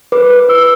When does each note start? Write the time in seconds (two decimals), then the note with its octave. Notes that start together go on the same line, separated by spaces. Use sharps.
0.12 B4 D6
0.30 B4
0.49 B4 E6